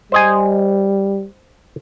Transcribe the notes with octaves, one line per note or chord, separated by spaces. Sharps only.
G3 C5 D#5 G#5